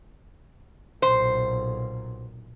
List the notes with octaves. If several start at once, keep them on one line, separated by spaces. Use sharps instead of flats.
B1 A#2 C5